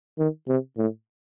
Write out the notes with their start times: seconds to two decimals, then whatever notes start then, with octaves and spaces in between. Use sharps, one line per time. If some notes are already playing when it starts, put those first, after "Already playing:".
0.19 D#3
0.48 C3
0.78 A2